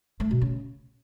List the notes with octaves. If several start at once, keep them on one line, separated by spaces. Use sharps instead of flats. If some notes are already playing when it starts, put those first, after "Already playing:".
A3
B2
C#3